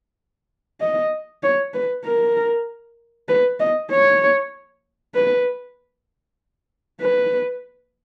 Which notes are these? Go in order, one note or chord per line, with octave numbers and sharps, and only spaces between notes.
D#5
C#5
B4
A#4
B4
D#5
C#5
B4
B4